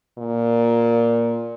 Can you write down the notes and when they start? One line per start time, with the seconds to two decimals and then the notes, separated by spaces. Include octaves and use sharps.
0.18 A#2